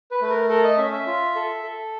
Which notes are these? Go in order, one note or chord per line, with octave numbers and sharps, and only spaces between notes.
B4
A3 B4
A#4
A4 A#4
D#5
C#4 E5
E5
F4
A4
A4